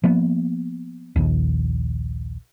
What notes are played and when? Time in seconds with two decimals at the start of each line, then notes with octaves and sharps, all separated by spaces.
0.04 F3 A#3 B3
1.16 A#1 D#2